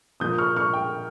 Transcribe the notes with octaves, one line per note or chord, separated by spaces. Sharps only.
A#2 F3 A#3 F4 D#6 G6
C#6 F6
C#6 F6
G5